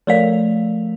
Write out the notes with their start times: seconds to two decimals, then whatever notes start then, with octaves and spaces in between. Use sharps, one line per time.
0.07 F3 A3 A#4 C#5 D5 F5